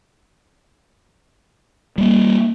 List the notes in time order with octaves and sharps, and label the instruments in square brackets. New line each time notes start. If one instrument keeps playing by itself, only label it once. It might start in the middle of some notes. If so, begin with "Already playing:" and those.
[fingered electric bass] G3 A#3